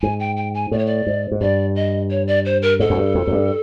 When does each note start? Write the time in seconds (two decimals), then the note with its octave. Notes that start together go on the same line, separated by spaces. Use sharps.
0.02 G#2 G#5
0.20 G5
0.37 G5
0.54 G#5
0.71 A2 D5
0.78 C#5
0.86 D5
1.07 G#2
1.32 G#2
1.41 G2 D5
1.76 D#5
2.11 C#5
2.28 D5
2.45 C5
2.62 A#4
2.80 G#2 A4
2.90 F#2
2.97 G2
3.15 F2
3.27 F#2
3.32 G2